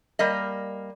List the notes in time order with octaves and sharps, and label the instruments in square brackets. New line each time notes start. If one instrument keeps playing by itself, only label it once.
[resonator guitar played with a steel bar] G3 A#3 D#5